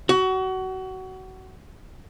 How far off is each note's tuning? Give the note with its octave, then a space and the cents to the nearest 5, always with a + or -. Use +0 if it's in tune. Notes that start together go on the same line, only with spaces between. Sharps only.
F#4 +25